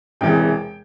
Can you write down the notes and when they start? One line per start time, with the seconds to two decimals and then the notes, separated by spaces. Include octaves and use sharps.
0.21 E1 E2 C3 E3 G5